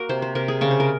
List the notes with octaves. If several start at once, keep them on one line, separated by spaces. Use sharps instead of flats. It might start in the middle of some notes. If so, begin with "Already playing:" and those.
Already playing: A#3 F#4 A#4
C3 C5
C5
C3 A#4
G#4
C#3 C#5
C5
A#4